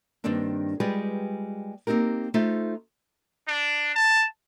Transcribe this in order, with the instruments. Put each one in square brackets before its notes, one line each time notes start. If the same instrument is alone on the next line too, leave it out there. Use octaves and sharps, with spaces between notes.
[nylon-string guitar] G2 D#3 A#3 C4 D4
G3 G#3 F4 G4 G#4 B4
A#3 C4 D#4 G4 A#4
A3 D#4 F4 A4 C5 E5
[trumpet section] D4
A5